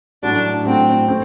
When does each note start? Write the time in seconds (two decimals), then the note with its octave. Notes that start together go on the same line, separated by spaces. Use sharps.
0.23 A2 F#3 A3 D4
0.65 A2 F#3 A3 C4
1.08 A3 C4